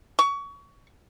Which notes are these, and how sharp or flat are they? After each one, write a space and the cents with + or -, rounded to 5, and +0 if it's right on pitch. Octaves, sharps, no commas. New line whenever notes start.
C#6 +25